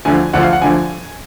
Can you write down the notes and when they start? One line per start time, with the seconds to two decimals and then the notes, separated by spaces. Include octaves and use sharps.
0.05 D2 D3 F3 G#5
0.33 D2 D3 F3 F#5
0.43 F5
0.53 F#5
0.62 D2 D3 F3 G#5